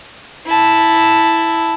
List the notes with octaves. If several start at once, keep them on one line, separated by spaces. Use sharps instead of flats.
E4 A5